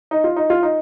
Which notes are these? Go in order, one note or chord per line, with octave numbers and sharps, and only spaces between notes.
D#4
F4
D#4
F4
D#4